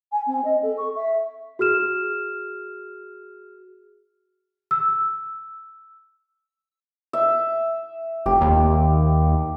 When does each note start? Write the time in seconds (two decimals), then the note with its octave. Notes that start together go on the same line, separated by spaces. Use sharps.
0.12 G#5
0.27 C4
0.45 D#5
0.63 A4
0.78 C#6
0.96 E5
1.59 F#4 G#4 F6 E7
4.71 E6
7.13 E5
8.26 F1 G4
8.41 D#2